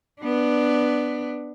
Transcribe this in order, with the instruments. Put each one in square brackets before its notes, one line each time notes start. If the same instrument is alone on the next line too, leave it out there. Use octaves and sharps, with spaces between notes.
[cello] B3 D4